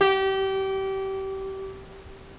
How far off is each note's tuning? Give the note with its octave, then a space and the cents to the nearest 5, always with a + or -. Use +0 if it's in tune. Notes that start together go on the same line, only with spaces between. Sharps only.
G4 -25